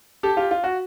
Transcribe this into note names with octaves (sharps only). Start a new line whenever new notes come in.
G4 A4
F4 G4
F4
F#4